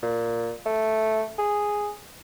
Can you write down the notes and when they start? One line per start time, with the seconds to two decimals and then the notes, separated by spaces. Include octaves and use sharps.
0.03 A#2
0.66 A3
1.38 G#4